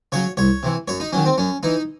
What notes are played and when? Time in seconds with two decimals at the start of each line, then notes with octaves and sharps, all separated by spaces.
0.12 C#3 F#3 C#5
0.37 C2 C#5
0.63 C3 E3
0.88 F#2 C#5
1.00 D#4
1.13 D#3 F#3 C#4
1.25 C4
1.38 F#2 C#4
1.63 E3 D#4